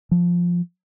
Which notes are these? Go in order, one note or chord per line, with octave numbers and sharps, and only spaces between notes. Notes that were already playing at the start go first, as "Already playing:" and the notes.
F3